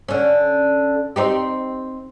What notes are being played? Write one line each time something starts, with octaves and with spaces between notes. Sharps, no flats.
D3 C#4
C4 D#4 G4